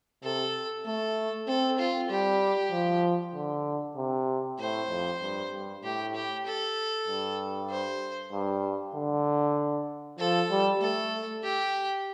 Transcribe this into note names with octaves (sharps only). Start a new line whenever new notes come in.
C3 A4
A3 A4
C4 A4
F4
G3 G4
F3
D3
C3
A2 C5
F2
G2
G2
A2 G4
G4
A4
G2
C5
G2
D3
F3 A4
G3
A3 A4
G4